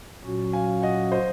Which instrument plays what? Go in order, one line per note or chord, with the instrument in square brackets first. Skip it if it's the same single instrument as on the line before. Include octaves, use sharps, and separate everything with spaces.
[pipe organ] A#2 F#3 C#4 F#4
[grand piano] F5 G#5
D#5 F#5
C5 D#5